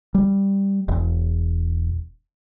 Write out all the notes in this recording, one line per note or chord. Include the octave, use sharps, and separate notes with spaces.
G3
E1